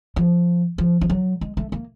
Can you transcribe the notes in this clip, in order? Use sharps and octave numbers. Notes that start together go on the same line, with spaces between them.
F3
F3
F3
F#3
G#3
A3
A#3